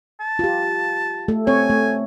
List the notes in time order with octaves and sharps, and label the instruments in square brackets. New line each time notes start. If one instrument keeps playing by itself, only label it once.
[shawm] A5
[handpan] F4 G4
A3 A4
[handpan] C4 C#5 [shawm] G#5
[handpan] A3